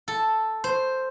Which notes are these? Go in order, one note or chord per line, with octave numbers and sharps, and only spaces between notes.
A4
C5